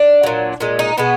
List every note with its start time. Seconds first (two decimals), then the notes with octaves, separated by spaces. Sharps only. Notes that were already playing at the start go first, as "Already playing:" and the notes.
Already playing: D4
0.23 A#2 F#3
0.60 A#2 G#3
0.79 D#4
0.98 B2 G#3 B3